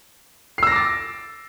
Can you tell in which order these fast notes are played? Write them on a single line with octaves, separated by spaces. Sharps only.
C7 E6 A#6 D6 A6